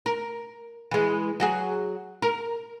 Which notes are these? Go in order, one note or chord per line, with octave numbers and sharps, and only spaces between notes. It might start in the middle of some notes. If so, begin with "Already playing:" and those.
A#4
E3 G#3
F#3 F#4 G#4
A#4